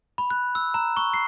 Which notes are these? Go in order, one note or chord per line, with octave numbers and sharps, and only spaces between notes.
B5
F#6
E6
A#5
C#6
C7